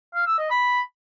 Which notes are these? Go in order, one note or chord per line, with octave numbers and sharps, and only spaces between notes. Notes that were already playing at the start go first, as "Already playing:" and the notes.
F5
E6
D#5
B5